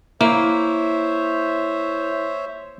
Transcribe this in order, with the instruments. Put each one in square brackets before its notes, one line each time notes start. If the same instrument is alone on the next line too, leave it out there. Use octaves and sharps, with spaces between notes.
[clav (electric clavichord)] A#3 [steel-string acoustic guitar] E4 [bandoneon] C5 C#5 E5